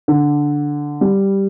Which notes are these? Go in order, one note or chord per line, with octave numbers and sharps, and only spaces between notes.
D3
G3